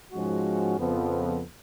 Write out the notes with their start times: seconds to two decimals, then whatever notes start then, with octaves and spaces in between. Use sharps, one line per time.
0.13 G#2 F3 G#3 C#4 F#4
0.78 F2 C#3 F3 B3